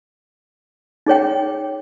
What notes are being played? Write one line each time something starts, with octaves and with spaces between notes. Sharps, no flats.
D#4 G#4 C#5 G5